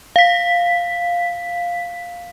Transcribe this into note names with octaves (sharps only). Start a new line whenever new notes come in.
F5 B6